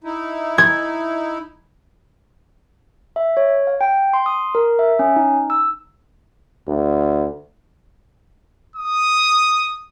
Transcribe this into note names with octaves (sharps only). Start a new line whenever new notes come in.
D#4 E4
G#6
E5
C#5
F5
G5
C6
D#6
A#4
E5
C#4
D#4
E6
D2
D#6